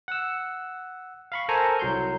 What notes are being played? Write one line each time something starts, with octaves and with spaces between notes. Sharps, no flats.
F#5 E6
F5 B5 C#6
A4 A#4 C5 G#5 A#5 C#6
C2 F#3 C6 G6